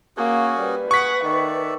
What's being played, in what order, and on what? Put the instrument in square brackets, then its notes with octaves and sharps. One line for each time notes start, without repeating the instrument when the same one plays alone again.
[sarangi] A#3 [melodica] C#4 F#4 G#4
[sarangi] G3 [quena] B4
[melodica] G#4 G#5 [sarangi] F#5 [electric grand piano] C#6 B6
[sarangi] D#3 [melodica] A4 D5 E5